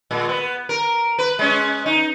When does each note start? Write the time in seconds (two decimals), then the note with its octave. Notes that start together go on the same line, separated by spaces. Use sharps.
0.11 A#2 G#3
0.29 B3
0.69 A#4
1.19 B4
1.39 G#3 C#4
1.86 D#4